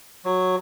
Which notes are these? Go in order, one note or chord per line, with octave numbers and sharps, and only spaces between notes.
F#3